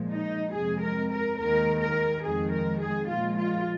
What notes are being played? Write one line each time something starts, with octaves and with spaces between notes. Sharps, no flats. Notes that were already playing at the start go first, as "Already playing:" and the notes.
Already playing: A#2 F3 G#3
D#4
F2 C3 G#3 G#4
A#4
A#4
D#2 D#3 G#3 A#4
A#4
F2 D#3 G#3 G#4
A#4
G#4
A#2 F3 G#3 F4
F4